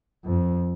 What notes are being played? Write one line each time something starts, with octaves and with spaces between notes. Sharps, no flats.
F2